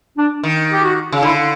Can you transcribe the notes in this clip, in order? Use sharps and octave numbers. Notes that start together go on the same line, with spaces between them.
D4
D#3
G4
F#4
C#3
D3 E4